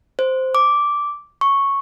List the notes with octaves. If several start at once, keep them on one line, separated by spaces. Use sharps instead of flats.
C5
D6
C#6